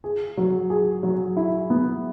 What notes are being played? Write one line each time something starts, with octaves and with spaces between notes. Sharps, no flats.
G#4
F#3
G#4
F#3
E4
B3